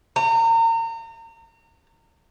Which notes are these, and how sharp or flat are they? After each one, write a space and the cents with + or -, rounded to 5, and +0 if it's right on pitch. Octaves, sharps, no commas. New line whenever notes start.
A#5 -35